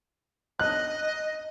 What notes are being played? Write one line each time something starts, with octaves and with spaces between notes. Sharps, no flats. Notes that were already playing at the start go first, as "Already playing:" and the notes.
D#5 F#6